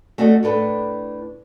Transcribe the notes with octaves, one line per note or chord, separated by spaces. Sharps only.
A3 F#4 A4 D5 D#5
A2 D4 A4 B4